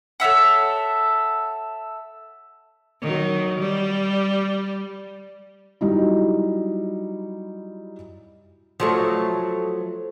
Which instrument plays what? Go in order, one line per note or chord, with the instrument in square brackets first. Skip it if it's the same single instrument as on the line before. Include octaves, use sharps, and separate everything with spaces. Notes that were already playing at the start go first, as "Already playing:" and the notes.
[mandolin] A4 C#5 E5 F#5
[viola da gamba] D#3 F#3
G3
[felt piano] F#3 G3 D#4 E4
[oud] F3 F#3 A3